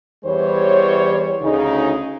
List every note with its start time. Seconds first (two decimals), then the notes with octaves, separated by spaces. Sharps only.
0.25 E2 E3 G3 C5 C#5
1.41 D2 C#3 D#4